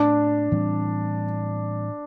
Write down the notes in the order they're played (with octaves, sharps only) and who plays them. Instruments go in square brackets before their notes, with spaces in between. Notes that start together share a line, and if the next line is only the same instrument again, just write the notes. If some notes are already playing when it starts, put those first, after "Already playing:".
Already playing: [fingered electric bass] A2 A3 C4 [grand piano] D4
[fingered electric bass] A2 E3 G3 C4